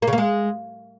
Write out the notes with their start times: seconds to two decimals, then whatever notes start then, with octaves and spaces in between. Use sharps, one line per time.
0.02 A#3
0.07 C#3
0.13 A#3
0.18 G#3